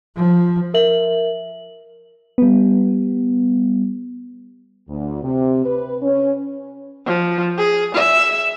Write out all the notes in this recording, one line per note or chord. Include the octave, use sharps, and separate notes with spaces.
F3
A#4 E5 F#7
G3 B3
D2
C3
B4
C#4
F3
G#4
E5